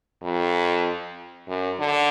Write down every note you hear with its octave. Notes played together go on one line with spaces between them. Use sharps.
F2
F#2
D3